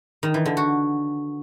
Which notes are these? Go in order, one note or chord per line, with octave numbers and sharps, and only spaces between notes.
D#3
E3
D3
F#4